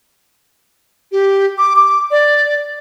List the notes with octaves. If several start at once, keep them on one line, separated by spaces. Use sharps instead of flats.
G4
D6
D6
D5